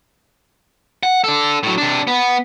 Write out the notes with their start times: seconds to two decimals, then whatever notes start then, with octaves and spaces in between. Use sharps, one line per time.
1.03 F#5
1.24 D4 A4
1.63 A2 F#3
1.78 C3 D4
2.07 B3